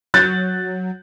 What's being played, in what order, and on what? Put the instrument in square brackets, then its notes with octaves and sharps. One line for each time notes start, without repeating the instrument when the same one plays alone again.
[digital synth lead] F#3 [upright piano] F#6 G6 A6